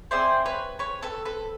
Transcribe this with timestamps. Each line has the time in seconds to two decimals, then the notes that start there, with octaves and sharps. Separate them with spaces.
0.11 C4 E4 G#4 C5 D5
0.46 B4 C#5
0.79 B4 C#5
1.02 A4 B4
1.25 A4 B4